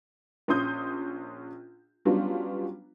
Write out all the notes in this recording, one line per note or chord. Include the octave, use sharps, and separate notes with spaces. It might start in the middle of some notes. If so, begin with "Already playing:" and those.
A#1 C#4 C6 D#6 G6
F#3 G3 B3 C#4 D4 F4